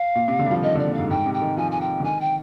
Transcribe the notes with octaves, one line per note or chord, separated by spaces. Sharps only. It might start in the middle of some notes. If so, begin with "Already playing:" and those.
Already playing: F5
A#2
C3
D3
G3
F3
D#3 D#5
D3
D5
A#2
G#2 F5
G#2 G5
C3
G5
D#3
F3 G#5
G#5
G5
D3
D#3 G#5
G5